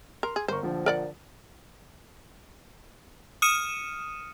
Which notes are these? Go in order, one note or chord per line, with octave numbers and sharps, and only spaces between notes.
A#4 C6
G#4
G1 A#4 C5 C#6
A#1 D3 F3
A#4 D5 F#5
D#6 F6 C#7 D#7 E7